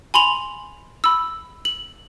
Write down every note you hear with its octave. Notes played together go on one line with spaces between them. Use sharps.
G#5 B5 C6 F7 F#7
B5 E6
F#7